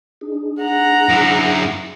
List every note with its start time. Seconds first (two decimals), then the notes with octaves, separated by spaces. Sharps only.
0.21 D4 D#4 G#4
0.61 F#5 A#5
1.09 F#2 E4